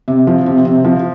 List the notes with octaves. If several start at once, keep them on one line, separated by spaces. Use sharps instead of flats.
C3
F3
C3
C3
F3